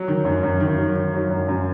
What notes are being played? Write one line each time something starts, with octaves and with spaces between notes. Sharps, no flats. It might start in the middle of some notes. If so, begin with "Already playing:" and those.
Already playing: F#3
D#3
F#2
F#2
D#3
F#3
D#3
F#3
F#2
F#2